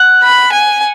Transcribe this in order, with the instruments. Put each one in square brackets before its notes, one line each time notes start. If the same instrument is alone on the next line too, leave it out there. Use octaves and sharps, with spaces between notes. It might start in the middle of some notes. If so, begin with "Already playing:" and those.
Already playing: [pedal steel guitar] F#5
[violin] B5
G#5